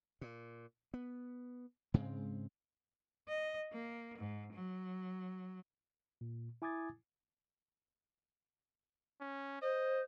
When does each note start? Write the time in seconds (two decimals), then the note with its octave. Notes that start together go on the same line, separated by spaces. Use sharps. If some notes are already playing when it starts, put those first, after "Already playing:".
0.21 A#2
0.94 B3
1.94 G#2 C#3 G#3 C4
3.28 D#5
3.73 A#3
4.18 G#2
4.53 F#3
6.21 A#2
6.62 E4 G#5 D6 D#6 G#6 A6
9.21 C#4
9.62 C5 D#5